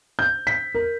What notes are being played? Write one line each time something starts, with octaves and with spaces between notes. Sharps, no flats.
G6
B6
A#4